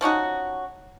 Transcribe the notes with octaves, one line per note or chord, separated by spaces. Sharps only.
F3 C#4 D#4 F#4